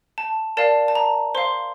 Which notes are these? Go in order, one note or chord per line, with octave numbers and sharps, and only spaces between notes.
A5
A#4 D5 F5 A5
A5
A#5
C5 F5 C6